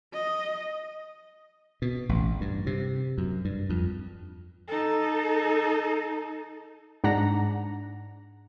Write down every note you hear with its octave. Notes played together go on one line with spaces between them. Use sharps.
D#5
B2
A1
G2
C3
F#2
G2
F2
D#4 A4
G#2 D4 F#5 A#5 A#6